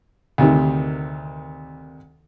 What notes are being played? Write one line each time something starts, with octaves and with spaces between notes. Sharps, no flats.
D2 C3 D#3